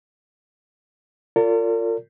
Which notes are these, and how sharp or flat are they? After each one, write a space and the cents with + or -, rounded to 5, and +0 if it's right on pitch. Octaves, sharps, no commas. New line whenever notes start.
F4 +0 A#4 -40 D5 -40